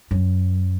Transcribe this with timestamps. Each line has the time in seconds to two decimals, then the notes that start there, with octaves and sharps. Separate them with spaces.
0.11 F#2